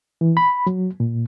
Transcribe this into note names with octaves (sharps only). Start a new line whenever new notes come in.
E3
B5
F#3
A#2